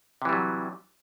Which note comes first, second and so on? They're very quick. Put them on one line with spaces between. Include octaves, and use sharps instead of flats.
C3 E3 G3 F#3